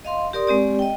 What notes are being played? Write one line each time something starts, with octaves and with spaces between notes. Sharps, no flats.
D#5 F5 C6
G4 A#4 D5 C6 D#6
G#3 C4 G4 D5
D#5 G5